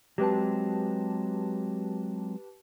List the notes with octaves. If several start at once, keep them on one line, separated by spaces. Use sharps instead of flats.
F#3 G#3 C4 G4 B4 A5